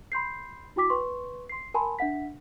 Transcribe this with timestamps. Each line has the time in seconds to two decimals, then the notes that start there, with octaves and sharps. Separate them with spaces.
0.12 B5 C6 G6 C7
0.76 E4 F#4 G5 D6 B6
0.90 B4 C6 C#6
1.49 C6 C7
1.74 A#4 G#5 A5 B5 C6
1.99 D4 E5 F#5 B6